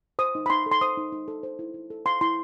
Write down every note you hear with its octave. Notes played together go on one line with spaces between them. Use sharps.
C5 D#6
D#4
B5
D#4 C6
A4
C6
C5 D#6
D#4
D#4
A4
C5
E4
E4
A4
C5 C6
E4 C6